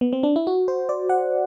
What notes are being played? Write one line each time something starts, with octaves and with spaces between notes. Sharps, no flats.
B3
C4
D4
E4
F#4
C5
D5
F#5